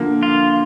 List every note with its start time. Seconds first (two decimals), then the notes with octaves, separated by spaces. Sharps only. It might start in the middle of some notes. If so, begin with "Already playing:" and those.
Already playing: D3 F3 A#3
0.23 F4